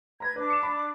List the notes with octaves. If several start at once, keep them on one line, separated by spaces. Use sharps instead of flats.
B4 A#5 B5 G#6 A#6
D4 B4 D6
C#7 E7
B5